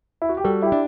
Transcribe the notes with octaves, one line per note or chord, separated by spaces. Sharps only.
E4
F#4
G4
G3 F#4 A4
E4 G4
D4